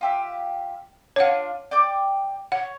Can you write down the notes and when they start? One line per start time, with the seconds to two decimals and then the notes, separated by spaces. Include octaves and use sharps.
0.01 F4 G4 E5
1.16 D4 D#4 F4 C#5 F#5
1.71 D5 G5 D6
2.52 C#5 F#5